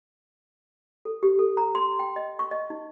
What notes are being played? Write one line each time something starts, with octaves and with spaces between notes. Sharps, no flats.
A4
G4
A4
A#5
C6
G5
D#5
C#6
D#5
D#4